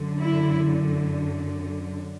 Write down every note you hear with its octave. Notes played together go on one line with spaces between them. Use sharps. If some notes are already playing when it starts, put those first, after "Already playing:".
Already playing: F#2 D3
E4